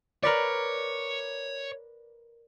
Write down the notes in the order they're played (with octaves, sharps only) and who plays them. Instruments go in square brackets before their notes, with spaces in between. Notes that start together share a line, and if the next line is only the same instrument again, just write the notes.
[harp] A#4 B4 D5 [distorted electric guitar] C#5